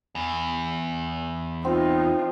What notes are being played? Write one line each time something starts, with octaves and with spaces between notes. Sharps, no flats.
E2
C4 D#4 F4